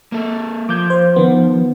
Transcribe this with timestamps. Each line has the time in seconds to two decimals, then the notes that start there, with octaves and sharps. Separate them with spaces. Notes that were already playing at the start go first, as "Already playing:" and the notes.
0.12 A#3 A4
0.69 F3 D6 G6 G#6
0.90 C5
1.16 D#3 B3